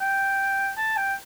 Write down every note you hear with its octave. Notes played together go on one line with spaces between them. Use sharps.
G5
A5
G5